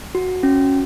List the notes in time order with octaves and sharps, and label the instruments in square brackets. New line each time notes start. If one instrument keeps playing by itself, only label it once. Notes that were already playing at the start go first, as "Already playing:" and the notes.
[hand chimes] F#4
C#4